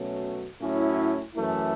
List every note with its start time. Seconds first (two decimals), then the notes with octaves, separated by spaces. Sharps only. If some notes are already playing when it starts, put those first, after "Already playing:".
Already playing: B2 F#3 A3 C#4
0.61 A2 F#3 C#4 E4
1.36 F#2 E3 A3 E4